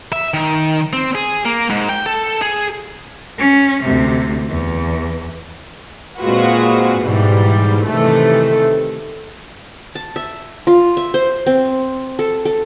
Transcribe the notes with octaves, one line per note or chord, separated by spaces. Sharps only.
E5
D#3
C4
G#4
A#3
G#2
G5
A4
G#4
C#4
D2 C3
E2
A#2 G#3 C4 F4 F#4 B4
G#2 B2 E3 G3
C3 D#3 E3 A3
A5
E5
F4
E5
C5
C4
A4
A4